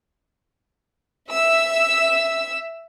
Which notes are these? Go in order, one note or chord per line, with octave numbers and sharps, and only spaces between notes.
E5 E6